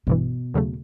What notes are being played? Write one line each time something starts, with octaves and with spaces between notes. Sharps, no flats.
G#1 G2 B2 E3
D#2 C#3 F#3 A3